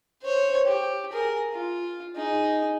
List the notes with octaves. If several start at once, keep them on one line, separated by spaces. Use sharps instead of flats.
C5 C#5
G4
G#4 A#4
F4
D#4 G#4